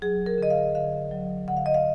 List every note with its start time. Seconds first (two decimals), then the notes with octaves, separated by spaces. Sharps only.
0.02 F#3 G#4
0.26 A#4
0.38 D3 D#5
0.50 F5
0.75 D3 F5
1.11 F#3
1.48 D3 F#5
1.57 F5
1.66 D#5
1.74 F5